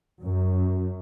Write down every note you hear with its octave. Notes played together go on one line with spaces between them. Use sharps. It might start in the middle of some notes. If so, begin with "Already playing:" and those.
F#2